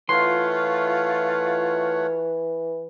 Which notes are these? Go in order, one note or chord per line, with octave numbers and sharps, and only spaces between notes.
E3 A3 F4 C#5 F#5 C6